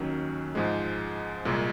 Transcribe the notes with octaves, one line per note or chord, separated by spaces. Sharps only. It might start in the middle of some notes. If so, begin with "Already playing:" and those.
Already playing: D#2 D#3 F#3 C#4
G#2 F3 G#3
C2 A#2 G#3